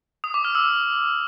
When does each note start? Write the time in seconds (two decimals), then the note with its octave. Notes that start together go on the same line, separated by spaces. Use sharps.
0.24 D#6
0.34 D6
0.45 F6
0.55 E6